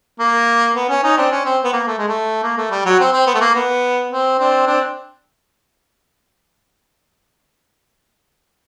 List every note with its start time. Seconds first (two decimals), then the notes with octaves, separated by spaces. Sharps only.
0.20 A#3
0.76 B3
0.89 C#4
1.03 C#4 D#4
1.17 C4 D4
1.31 C#4
1.46 C4
1.64 B3
1.73 A#3
1.88 A3
1.98 G#3
2.08 A3
2.43 A#3
2.58 A3
2.71 G3
2.86 F#3
3.00 C4
3.13 C4
3.27 B3
3.35 A3
3.41 A#3
3.55 B3
4.11 C4
4.39 C4 D4
4.67 C4 D4